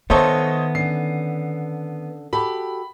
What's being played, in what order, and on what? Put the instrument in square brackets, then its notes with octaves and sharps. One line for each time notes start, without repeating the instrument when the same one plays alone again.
[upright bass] D#3 [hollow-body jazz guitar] B3 A4 [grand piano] C5 C#5 D#5 [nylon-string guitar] E5
[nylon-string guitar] D3 C#4 [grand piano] C7
[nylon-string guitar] F#4 G4 A4 [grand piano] B5